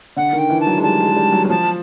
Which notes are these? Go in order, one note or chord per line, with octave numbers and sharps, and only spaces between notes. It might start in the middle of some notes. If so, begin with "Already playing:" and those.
D3 F#5
D#3
G5
E3
A5
F#3
G#3
G3 A5
G#3
G#3
G3
F#3
F#3
F3 A5